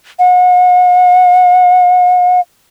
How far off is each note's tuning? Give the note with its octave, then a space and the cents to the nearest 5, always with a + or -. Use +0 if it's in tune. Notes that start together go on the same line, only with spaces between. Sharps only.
F#5 -40